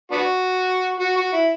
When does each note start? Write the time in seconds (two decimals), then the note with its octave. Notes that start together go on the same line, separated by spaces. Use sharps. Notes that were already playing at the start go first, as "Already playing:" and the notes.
0.12 B3 D4 F#4
1.00 F#4
1.17 F#4
1.33 E4